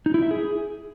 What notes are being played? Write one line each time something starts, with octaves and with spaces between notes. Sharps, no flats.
D#4
E4
E5
G#4